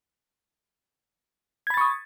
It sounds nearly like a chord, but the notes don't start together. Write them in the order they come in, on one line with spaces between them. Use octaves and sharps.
G#6 B5 A6 C#6 D#6